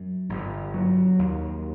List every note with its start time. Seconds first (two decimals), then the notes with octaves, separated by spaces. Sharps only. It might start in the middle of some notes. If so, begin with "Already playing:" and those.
Already playing: F#2
0.29 G1
0.74 F#3
1.19 D#2